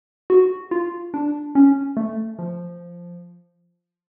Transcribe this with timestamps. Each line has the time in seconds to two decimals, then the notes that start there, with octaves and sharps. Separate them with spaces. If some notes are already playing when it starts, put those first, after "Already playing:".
0.30 F#4
0.71 F4
1.14 D4
1.55 C#4
1.97 A3
2.39 F3